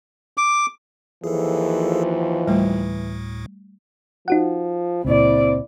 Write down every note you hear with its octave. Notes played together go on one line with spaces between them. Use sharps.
D6
D#2 E3 F3 G#4 A4
D2 A2 G3 A3
F3 D#4 F#4 F#5
C#2 A#2 C4 E4 D5